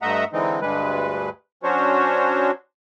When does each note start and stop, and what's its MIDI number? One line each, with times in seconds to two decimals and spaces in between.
0.02 0.24 43
0.02 0.24 57
0.02 0.24 75
0.02 0.24 76
0.02 0.24 78
0.02 0.24 82
0.33 0.60 50
0.33 0.60 52
0.33 0.60 56
0.33 0.60 60
0.33 0.60 63
0.61 1.29 38
0.61 1.29 43
0.61 1.29 55
0.61 1.29 56
0.61 1.29 71
1.63 2.51 54
1.63 2.51 61
1.63 2.51 62
1.63 2.51 66
1.63 2.51 72
1.63 2.51 73